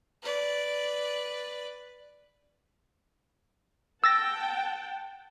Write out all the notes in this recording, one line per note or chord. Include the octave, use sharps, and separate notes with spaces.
B4 D5
F#5 G5 A5 E6 A6 A#6